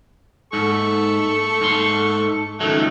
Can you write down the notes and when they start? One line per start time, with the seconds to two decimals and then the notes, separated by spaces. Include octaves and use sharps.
0.53 G#2 A4 C#6
1.61 G#2 C6
2.60 C#2 D#3 F#3 A3